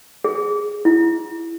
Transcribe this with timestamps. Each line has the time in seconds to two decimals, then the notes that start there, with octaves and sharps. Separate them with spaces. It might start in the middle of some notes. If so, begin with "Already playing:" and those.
0.24 G#4
0.85 E4